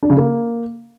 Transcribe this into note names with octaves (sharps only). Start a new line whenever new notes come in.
D4
C#3
A#3